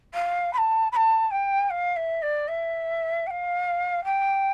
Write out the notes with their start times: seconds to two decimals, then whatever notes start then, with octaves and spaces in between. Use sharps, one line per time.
0.14 F5
0.53 B5
0.58 A5
0.92 B5
0.96 A5
1.31 G5
1.70 F5
1.96 E5
2.22 D5
2.48 E5
3.26 G5
3.30 F5
4.04 G5